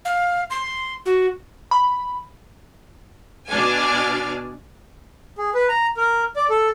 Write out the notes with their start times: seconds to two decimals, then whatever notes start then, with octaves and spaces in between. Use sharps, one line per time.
0.05 F5
0.50 C6
1.06 F#4
1.71 B5
3.49 B2 D4 D5 G#5 F6
5.38 G#4
5.54 B4
5.69 A#5
5.97 A#4
6.36 D5
6.50 A4